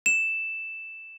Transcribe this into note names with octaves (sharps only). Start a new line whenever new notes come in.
E7